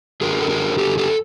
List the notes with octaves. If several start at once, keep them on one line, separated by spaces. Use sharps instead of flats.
F#2 D3 F#3 G#4 A#4
A4
G#4 A#4
G4 A4
G4 A4